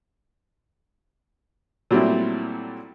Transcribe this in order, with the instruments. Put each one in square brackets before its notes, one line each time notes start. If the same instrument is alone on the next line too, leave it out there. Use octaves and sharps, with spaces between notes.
[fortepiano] A#2 F#3 G3 A3 C4 E4